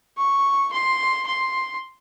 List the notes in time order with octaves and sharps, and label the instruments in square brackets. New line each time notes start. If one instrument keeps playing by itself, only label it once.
[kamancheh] C#6
C6
C6